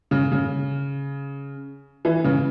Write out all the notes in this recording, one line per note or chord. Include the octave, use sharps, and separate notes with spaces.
C#3
C#3
E3
C#3